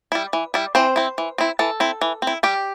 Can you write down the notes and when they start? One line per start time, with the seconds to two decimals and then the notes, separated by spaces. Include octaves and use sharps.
0.12 G3 E4
0.33 E3
0.54 G3 E4
0.75 E3 C4 C5
0.96 C4 E4
1.18 E3
1.38 C4 E4
1.59 E3 A4
1.80 C4 E4
2.02 E3
2.22 C4
2.27 E4
2.43 G3 G4